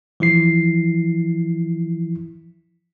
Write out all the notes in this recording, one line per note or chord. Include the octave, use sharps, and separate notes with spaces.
E3 F3 E4 C7